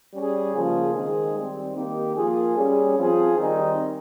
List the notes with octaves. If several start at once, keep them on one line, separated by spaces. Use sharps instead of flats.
G3 C#4 G#4
C#3 F3 A#3 F4 G#4
D#3 G#3 C4 D#4 G#4
D#3 G3 C4
D#3 A#3 D#4 G4
F3 A#3 F4 G#4
G3 C#4 G#4
F3 C4 F4 G#4
D#3 G3 C4 D#4